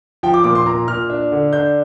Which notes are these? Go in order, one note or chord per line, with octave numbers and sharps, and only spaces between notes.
F3 G5
D6
A#2 D6
C6
A#2 A#5
A#2 F6
D4
D3
D4 G6